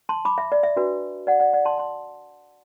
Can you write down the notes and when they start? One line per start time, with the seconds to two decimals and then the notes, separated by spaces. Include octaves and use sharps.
0.09 A5 C6
0.25 B5 D6
0.38 E5
0.52 D5
0.63 E5
0.76 D4 F#4 B4
1.27 D5 F#5
1.40 D5 F#5
1.53 D5 F#5
1.65 A5 C6
1.78 A5 C6